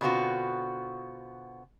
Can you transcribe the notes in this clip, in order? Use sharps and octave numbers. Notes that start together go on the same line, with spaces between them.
B2 D3 B3 C4 F4 F#4